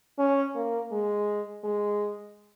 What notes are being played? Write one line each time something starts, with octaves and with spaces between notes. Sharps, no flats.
C#4
A#3
G#3
G#3